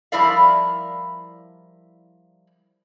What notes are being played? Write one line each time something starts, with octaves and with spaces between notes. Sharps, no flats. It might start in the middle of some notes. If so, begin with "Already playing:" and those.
F3 G3 E4 A#4 D5 F5